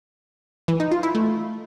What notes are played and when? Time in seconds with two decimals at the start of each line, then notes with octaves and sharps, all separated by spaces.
0.68 E3
0.80 D#4
0.91 F4
1.03 E4
1.15 A3